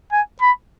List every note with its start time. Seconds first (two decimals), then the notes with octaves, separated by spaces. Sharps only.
0.12 G#5
0.42 B5